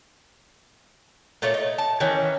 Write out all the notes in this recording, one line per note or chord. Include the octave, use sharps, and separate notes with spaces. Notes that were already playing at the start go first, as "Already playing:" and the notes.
A#2 A3 F4 C#5
D#4
A5
D#3 E3 C#4